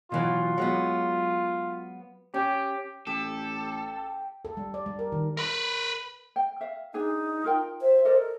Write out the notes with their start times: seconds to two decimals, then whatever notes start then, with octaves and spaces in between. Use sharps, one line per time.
0.12 B2 E3 F#3 F4
0.58 F#3 G#3 B3
2.34 C#4 G4
3.07 A1 G4 A4
4.45 A4
4.57 G3
4.74 D5
4.86 G3
4.99 A#4
5.12 D#3
5.37 A#4 B4
6.36 G5
6.61 E5 F5
6.94 D4 D#4 G#4 G#5
7.44 F4 A#4 G5
7.82 C5 E5
8.05 A4 A#4 D5 D#5